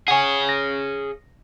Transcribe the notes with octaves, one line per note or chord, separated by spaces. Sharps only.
G#4 C#5 F#5 G#5
A#6